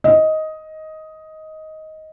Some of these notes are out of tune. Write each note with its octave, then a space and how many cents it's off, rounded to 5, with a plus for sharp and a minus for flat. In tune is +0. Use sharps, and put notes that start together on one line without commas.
D#5 +10